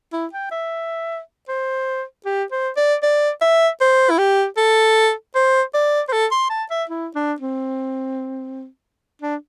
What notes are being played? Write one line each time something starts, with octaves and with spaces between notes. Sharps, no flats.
E4
G5
E5
C5
G4
C5
D5
D5
E5
C5
E4
G4
A4
C5
D5
C5
A4
C6
A5
E5
E4
D4
C4
D4